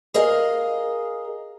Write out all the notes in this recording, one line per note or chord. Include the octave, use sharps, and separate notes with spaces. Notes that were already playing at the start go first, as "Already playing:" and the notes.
G#4 A#4 D#5 F5